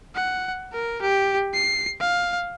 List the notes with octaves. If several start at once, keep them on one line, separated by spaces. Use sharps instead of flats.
F#5
A#4
G4
C7
F5